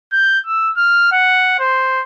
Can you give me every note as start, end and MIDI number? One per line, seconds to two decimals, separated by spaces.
0.12 0.39 91
0.46 0.70 88
0.77 1.11 89
1.12 1.56 78
1.60 2.03 72